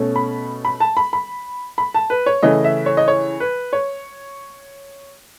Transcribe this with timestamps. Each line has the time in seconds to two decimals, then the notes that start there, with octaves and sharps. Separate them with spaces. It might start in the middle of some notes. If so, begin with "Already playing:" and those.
Already playing: B2 A3 C#4
0.16 B5
0.65 B5
0.80 A5
0.97 B5
1.13 B5
1.78 B5
1.94 A5
2.10 B4
2.26 C#5
2.43 C#3 E3 A3 C#4 D#5
2.64 E5
2.86 C#5
2.97 D#5
3.08 C#5
3.40 B4
3.73 C#5